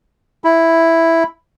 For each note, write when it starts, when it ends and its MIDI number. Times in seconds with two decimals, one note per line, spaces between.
0.44 1.24 64